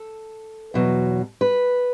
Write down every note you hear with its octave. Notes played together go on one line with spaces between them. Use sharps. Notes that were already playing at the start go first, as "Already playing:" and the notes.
Already playing: A4
E2 B2 F#3
B4